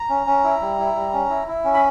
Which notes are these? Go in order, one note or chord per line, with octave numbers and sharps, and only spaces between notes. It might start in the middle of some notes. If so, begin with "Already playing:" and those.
Already playing: A#5
C#4
C#4
E4
G3
E4
G3
C#4
E4
E4
C#4
B5